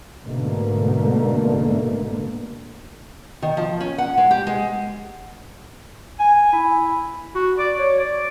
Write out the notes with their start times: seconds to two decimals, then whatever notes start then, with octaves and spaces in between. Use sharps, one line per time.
0.24 G#2 B2 D3 A3 A#3
3.42 D#3
3.57 F3
3.80 C#4
3.98 F#5
4.17 G#3
4.31 G4
4.47 G#3
6.19 G#5
6.52 E4
7.35 F#4
7.58 D5
7.78 C#5
7.99 D5